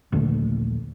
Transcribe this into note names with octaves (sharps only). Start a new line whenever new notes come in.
A#1 D#2 D3 A3